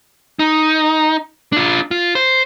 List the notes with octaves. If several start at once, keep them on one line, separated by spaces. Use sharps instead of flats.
D#4
D4 F4
F4
C5